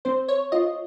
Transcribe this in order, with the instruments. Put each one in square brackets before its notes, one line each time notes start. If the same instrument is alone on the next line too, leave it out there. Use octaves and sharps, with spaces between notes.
[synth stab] C4 C5
C#5
F4 D#5